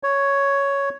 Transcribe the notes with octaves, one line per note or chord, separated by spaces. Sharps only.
C#5